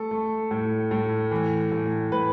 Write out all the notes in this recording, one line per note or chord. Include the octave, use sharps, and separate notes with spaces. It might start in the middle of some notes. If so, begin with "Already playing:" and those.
Already playing: A3 A4
A3
A2
A2
E3
A2
A2 B4